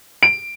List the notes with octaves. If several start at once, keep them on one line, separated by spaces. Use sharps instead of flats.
D7